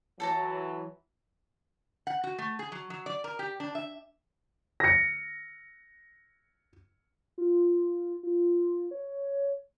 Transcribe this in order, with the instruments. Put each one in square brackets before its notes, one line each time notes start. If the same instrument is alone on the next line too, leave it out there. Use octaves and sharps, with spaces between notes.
[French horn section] E3 F#3 [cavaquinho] A4 A5 A#5
[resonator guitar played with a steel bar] F#5
F#4
A3
G#4
F#3
F#3
D5
A#4
G4
D4
E5
[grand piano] A#6 C#7
[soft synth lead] F4
F4
C#5